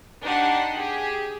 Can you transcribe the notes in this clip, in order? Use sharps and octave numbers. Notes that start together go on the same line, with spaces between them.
D4 D#4 G4 F#5 C6
G4 G#4